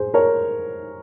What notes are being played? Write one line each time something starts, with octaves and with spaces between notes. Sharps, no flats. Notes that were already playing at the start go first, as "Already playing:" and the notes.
Already playing: G#4 C5
A#4 C#5